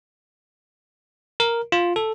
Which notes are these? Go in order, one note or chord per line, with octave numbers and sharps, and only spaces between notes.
A#4
F4
A4